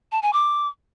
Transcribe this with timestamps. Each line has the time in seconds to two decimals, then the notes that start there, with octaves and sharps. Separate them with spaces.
0.12 A5
0.22 G#5
0.33 D6